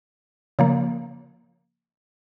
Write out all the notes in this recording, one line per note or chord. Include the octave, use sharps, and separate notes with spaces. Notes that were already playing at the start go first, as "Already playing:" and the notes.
C#3 F3 A#3